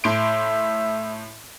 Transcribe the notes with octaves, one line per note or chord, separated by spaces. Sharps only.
A2 E5 C6 D7